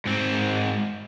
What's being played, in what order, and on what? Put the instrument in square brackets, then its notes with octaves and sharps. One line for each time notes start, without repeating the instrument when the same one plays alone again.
[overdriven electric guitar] G#2 C4